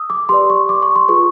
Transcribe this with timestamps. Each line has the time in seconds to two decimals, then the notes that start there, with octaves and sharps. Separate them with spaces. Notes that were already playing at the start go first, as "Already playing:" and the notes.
Already playing: D#6 E6
0.10 D6
0.29 G4 B4 D5 C6
0.50 C#6
0.69 D6
0.82 C#6
0.96 C6
1.08 F4 G#4 B4 C#6